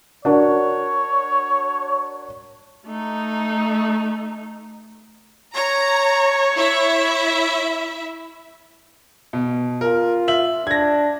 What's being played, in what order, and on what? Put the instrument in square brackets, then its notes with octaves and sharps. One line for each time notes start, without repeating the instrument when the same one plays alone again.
[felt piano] D4 F#4 A#4 [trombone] C#5
[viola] A3 D#4
[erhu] C#5 [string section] A#5
[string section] E4 E5
[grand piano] B2
[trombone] F4 [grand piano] A#4
[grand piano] E5 F#7
[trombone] D4 [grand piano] G#6 A#6